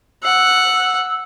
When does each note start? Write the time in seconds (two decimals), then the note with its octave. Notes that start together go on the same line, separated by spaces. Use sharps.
0.23 F#5 E6